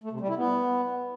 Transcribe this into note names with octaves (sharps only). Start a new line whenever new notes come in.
A3
C3
G3
E4
B3